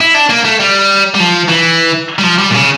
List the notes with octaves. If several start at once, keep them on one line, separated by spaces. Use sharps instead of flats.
E4
D4
A#3
A3
G3
G3
F3
E3
G3
F3
G3
A#2
C#3